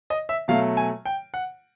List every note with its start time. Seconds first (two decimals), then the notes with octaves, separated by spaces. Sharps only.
0.10 D#5
0.29 E5
0.48 B2 F#3 A3 F5
0.77 G#5
1.05 G5
1.34 F#5